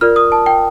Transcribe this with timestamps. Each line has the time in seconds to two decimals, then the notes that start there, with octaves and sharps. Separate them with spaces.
0.01 F4 A#4 D5 F6
0.16 D#6
0.32 A5
0.46 G5